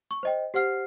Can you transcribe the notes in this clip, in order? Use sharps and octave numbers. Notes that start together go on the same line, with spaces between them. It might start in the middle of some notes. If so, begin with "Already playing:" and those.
C#6
C5 D#5 G5
G4 C5 F#5 F6 C7